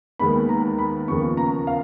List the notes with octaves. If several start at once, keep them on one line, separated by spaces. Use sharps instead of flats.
D#2 D#3 G#3 B3 B5
A#5
B5
D#2 C#3 F3 B3 C#6
A#5
F5